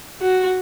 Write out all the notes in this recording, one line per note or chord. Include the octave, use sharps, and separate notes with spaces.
F#4